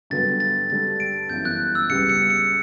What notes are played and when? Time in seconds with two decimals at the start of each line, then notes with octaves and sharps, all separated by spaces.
0.10 G2 D3 F#3 B3 A6
0.40 A6
0.70 G2 D3 G3 D4 A4 A6
1.00 D7
1.30 G1 F#2 E3 G6
1.45 F#6
1.75 E6
1.89 C#2 C#3 G3 B3 C#7
2.09 C#7
2.30 C#7